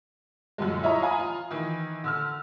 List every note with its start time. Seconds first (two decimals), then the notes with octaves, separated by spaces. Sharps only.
0.58 F#2 A#2 D3 G3 G#3
0.83 E4 F4 C#5 D#5 E5 A#5
1.02 F5 G#5 A#5 B5 D#6
1.19 F4
1.51 D#3 E3
2.04 D3 E6 F6